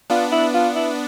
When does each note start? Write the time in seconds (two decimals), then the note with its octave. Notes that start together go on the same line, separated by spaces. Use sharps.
0.10 B3 D4 F4
0.32 E4
0.54 F4
0.75 E4